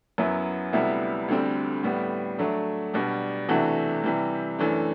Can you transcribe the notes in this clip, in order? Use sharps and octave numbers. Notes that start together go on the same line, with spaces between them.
F#2 F#3 B3 E4
D2 C3 G3 B3 E4
D2 D3 G3 C4
A2 G3 B3
F#3 A3 D4
B2 G3 D4
C3 E3 A3 D4 F#4
C3 E3 G3
F#2 E3 A3 D4